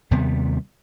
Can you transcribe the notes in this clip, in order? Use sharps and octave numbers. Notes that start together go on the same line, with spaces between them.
D#2 C3 G3 B3